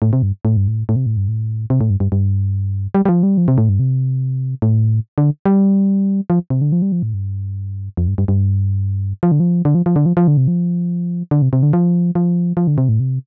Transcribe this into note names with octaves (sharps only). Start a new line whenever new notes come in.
A2
C3
G2
A2
G2
A2
A2
C3
A2
G2
A2
C3
A2
G2
G2
G2
G3
G3
F3
G3
F3
C3
A2
G2
C3
A2
D3
G3
F3
C3
D3
F3
G3
F3
A2
G2
F2
G2
G2
G2
F3
D3
F3
D3
F3
F3
D3
F3
F3
D3
C3
F3
D3
C3
C3
D3
F3
F3
F3
D3
C3
A2
C3